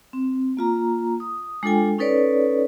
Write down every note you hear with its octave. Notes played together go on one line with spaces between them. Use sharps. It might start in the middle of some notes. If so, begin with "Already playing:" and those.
C4
A#3 F4 A#5
D#6
G#3 D4 F4 A4 G5 G#5
C#4 D#4 A4 B4 C#5 D5